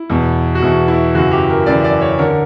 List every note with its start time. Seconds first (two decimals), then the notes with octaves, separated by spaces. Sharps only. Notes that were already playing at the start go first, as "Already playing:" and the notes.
Already playing: E4
0.10 E2 B2
0.55 F#4
0.62 E2 B2 E4
0.88 E4
1.15 F#2 C#3 E3 F#4
1.32 G4
1.50 A#4
1.66 F#2 C#3 E3 D5
1.84 D5
2.01 C#5
2.19 D3 A#4
2.30 A#4